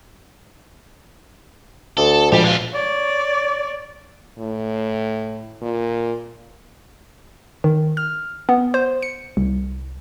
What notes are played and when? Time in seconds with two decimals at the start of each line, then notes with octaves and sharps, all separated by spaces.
1.97 D2 A4
2.32 A#2 F3 G3 G#3 G4
2.44 B2 D3 F4
2.73 C#5 D5
4.39 A2
5.62 A#2
7.64 D#3
7.97 F6
8.49 B3
8.74 C5
9.02 C#7
9.37 C2